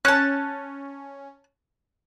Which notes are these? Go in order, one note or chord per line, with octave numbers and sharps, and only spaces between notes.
C#4 A5 F#6